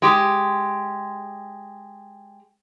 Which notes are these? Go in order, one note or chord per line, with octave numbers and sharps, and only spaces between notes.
G#3 G4